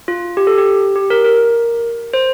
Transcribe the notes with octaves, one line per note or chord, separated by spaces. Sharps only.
F4
G4
A4
G4
G4
A#4
A#4
C5